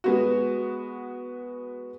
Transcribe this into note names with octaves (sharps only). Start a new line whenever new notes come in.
G#3 B3 F#4